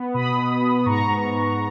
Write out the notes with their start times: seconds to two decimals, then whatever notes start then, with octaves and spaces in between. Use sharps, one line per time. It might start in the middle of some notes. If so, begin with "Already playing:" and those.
Already playing: B3
0.14 B2 B5 D#6
0.38 B2
0.62 B3
0.86 G#2 A#5 C#6
1.10 G#2
1.34 B3